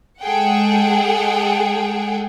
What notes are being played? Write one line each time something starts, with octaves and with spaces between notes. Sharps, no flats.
G#3 G#4 A4 F#5 G5